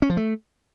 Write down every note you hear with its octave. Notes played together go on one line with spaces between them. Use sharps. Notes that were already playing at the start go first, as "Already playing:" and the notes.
C#4
F3
A3